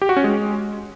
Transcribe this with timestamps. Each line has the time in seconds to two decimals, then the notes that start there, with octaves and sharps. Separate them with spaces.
0.02 G4
0.09 F#4
0.17 C#4
0.24 G#3